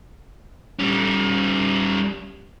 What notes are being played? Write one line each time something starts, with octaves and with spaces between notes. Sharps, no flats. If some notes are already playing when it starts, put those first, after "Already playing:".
G3 C#4